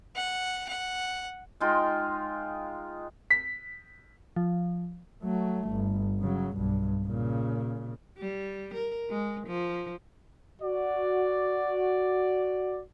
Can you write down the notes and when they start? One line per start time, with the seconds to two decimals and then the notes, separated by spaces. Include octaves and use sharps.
0.16 F#5
0.69 F#5
1.60 G#3 D#4 F4 G5
3.30 B6
4.36 F3
5.23 F#3 A3
5.70 G1
6.20 C#3 F#3
6.57 B1 G2
7.06 A#2 C#3
8.18 G3
8.74 A#4
9.09 G#3
9.47 F3
10.62 F#4 D5